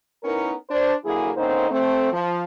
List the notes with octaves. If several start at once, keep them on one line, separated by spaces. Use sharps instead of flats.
B3 C#4 D#4 E4 A#4
D4 C5
D3 F#3 A#3 E4 G#4
D3 A#3 C4 C#4 D#4 C5
A3 C4
F3